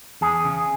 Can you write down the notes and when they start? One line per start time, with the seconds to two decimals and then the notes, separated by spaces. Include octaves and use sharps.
0.21 E2 G#4
0.44 C#3